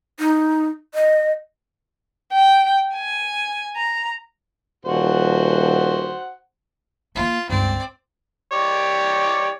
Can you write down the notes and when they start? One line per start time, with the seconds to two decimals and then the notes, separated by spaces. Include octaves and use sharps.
0.19 D#4
0.94 D#5
2.32 G5
2.95 G#5
3.76 A#5
4.85 D#1 F#4 C5 F#5
7.15 A3 A#3 F4
7.49 C#2 G2 C4 D5
8.52 G4 C#5 D5